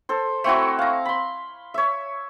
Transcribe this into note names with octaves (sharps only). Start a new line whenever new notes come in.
A4 C5
A3 C4 E4 F#4
F5 A#5
B5 C6
C#5 E5